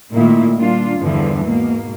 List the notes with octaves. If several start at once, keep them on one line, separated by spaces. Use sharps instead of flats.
A#2 D#3 A3 A#3 E4
A#2 G3 A#3 D4 F4
E2 G2 D3 E3 F3
G#2 B2 A#3